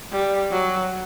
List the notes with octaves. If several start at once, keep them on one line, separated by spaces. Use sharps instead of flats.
G3
F#3